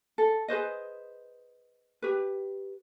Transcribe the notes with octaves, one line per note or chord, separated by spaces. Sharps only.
A4
G#4 B4 C5 D#5
G4 B4